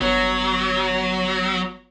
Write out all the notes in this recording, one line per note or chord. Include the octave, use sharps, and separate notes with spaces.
G1 F#3 B3 C#5